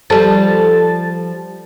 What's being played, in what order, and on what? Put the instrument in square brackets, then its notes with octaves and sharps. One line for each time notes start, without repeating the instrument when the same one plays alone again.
[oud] F3 G3 [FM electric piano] A4 A5 A6